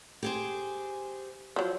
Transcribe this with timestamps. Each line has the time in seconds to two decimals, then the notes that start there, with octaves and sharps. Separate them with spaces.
0.23 G4 G#4 C5
1.56 F3 F#3